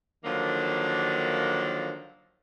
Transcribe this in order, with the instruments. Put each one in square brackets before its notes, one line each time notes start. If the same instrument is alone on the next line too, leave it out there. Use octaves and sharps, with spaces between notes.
[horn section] D3 D#3 F3 F#3 A#3 D4